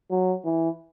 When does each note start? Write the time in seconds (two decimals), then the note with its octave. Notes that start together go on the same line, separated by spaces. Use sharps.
0.11 F#3
0.45 E3